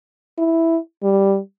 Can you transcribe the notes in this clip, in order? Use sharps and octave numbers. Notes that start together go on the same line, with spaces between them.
E4
G3